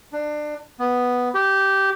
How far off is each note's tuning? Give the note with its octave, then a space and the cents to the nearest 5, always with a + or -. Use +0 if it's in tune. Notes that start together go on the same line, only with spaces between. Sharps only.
D4 +25
B3 +0
G4 -10